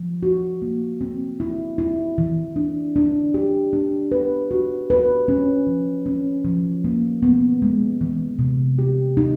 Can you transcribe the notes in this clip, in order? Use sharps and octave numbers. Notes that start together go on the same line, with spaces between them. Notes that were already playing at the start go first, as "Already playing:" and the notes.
Already playing: F3
F#4
A#3
C4
E4
E4
E3
D4
D4
G4
D4
B4
F#4
B4
C#4
F3
C#4
F3
A#3
B3
G#3
E3
C3
G4
D#4